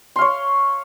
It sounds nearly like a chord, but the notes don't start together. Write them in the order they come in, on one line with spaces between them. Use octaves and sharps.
C6 F5 C#5